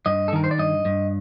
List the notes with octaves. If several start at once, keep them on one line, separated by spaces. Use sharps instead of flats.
G2 D#5
A4
D#3 A#4
C5
D5
G2 D#5
G2